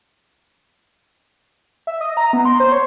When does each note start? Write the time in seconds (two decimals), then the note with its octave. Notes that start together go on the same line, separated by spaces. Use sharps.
1.87 E5
2.01 D#5
2.17 A#5
2.33 B3
2.45 C6
2.60 C5
2.72 C#5